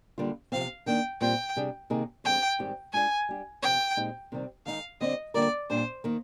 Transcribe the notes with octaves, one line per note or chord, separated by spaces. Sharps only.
D3 G3 A#3 D4 F4
C3 F3 C4 F5
D#3 A#3 D4 G5
A#2 G3 C4 F4 G5
C3 G3 D4 G#4
C3 D#3 A#3 D#4 G#4
F2 D3 G#3 C4 G4 G5
G#2 D#3 G3 C4 G4
G#3 D4 F4 G#4 D5 G#5
G3 D4 G4
C3 F3 C4 G5
A#2 G#3 C4 D#4 G4
C3 D#3 G3 C4
D#3 G#3 D#4 G#4 F5
D3 G3 C4 G4 D5 D#5
D3 G3 A#3 F4 A#4 D5
A#2 G3 D4 C5
D#3 A#3